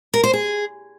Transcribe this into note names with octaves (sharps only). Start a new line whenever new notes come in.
A#4
C5
G#4